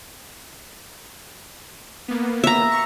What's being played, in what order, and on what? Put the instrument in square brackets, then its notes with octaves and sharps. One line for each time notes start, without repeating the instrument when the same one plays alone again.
[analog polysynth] A#3 B3
[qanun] E5 A#5
[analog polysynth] C#6